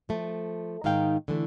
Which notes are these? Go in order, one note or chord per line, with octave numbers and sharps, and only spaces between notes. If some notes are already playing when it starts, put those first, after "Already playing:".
F3 A3
G#2 D#3 D#4 F5 G5
D3 E3 A3